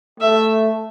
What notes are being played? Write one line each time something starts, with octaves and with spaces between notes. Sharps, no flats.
A3 E5